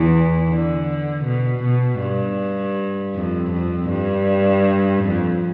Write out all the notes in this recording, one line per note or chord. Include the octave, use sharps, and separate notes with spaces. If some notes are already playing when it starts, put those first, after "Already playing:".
Already playing: E2 E3
D3
B2
B2
G2
F2
F2
G2
F2